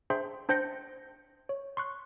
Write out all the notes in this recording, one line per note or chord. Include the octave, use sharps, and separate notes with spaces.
D4 G#4 C5 E5 G5 C6
D4 C5 G5 G6 A#6 C#7
C#5
C6 C#6 F#6